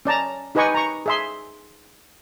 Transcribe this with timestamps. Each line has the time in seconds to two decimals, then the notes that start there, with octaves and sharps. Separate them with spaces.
0.05 C#4 D5 A5 A#5
0.55 D#4 G4 B4 D#5 G#5 C#6
0.74 A#5 C#6
1.06 G#4 E5 C6